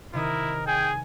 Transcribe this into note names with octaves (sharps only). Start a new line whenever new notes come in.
C3 D#3 E4 A#4 D#6
G#4 G5 G#5